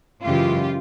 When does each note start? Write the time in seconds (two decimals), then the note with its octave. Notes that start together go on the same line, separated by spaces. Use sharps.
0.25 F#2 C#3 E3 G#3 F4 G4